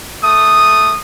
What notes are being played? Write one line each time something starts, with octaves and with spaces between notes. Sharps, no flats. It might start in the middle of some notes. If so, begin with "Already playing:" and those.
A3 D#6